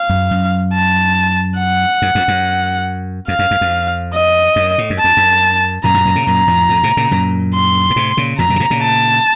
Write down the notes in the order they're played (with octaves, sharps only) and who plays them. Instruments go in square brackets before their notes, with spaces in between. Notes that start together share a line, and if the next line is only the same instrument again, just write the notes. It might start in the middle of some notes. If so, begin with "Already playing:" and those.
Already playing: [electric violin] F5
[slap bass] F#2
F#2
[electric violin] A5
F#5
[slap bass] F#2
F2
F#2
[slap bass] F2 [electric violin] F5
[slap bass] F#2
F#2
F2
[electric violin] D#5
[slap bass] F#2
A2
F#2
[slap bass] F2 [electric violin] A5
[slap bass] F#2
[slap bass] F#2 A#2 [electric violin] A#5
[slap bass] F#2 A#2
F#2 A#2
A#2 C#3
[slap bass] F#2 A#2 [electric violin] A#5
[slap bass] F2 A2
F2 A2
A2 C3
A#2 C#3
F#2 A#2
[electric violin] C6
[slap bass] A#2
A2 C3
A#2 C#3
[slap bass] F2 A2 [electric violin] A#5
[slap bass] F#2 A#2
C#3
A2 C3
A#2 C#3
[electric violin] A5